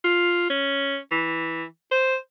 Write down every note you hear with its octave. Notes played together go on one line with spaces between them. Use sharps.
F4
C#4
E3
C5